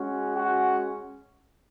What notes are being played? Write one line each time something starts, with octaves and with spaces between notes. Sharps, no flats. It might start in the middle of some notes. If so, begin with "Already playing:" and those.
Already playing: G#3 C#4 F#4
F#4 F#5